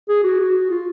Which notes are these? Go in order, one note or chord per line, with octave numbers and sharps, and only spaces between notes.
G#4
F#4
F#4
F4